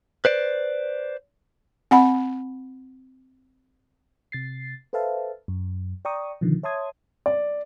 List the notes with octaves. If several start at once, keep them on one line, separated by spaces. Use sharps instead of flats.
B4 C5 D5
C4 F#5 B5
C3 A6 C7
A4 B4 C5 E5 F5 A5
F#2
D5 G5 A#5 C#6 D#6
B2 D3 D#3 F3
C#5 E5 A5 C6 D#6 G#6
D5